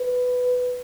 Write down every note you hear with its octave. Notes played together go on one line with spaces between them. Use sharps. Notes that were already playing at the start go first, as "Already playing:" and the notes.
Already playing: B4